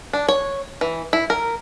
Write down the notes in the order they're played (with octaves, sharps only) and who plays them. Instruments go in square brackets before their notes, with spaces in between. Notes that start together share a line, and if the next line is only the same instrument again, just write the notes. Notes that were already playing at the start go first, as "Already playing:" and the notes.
[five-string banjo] D4
C#5
E3
E4
A#4